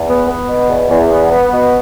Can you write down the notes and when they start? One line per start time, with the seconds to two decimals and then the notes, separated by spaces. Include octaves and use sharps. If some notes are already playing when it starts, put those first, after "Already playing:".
Already playing: E2
0.09 B3
0.29 B3
0.48 B2
0.69 E2
0.90 E2
1.11 B3
1.31 B3
1.52 B2